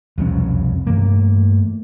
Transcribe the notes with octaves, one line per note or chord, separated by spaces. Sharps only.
E1 C2 F2 C#4
G2 E3 A3 A#3